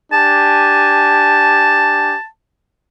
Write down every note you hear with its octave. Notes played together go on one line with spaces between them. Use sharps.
D4 G4 G#5 A5